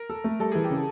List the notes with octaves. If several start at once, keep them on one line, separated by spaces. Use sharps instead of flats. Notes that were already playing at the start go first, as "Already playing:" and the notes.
Already playing: A#4
A4
A3
G3 A4
E3 G#4
G4
C#3